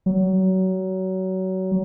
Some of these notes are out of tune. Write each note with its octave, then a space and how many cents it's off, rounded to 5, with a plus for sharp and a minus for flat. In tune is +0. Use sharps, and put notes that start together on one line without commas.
F#3 +25